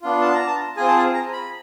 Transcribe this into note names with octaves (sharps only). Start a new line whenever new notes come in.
B3 D4 F4
A5
A#5
A5
C4 F4 G#4 G#5
A5
G#5
A#5
B5